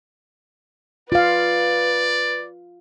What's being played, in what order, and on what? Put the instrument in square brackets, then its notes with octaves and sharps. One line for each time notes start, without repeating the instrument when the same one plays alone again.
[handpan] F4 F5 [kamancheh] B4 [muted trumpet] D5